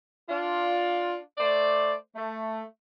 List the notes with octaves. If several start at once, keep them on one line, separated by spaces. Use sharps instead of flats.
D4 F4
A3 C5 D5
A3